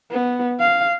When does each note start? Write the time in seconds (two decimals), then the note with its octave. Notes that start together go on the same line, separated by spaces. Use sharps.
0.11 B3
0.60 F5